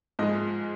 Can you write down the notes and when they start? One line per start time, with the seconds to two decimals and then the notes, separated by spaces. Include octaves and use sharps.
0.19 G#2 F3 G#3 D#5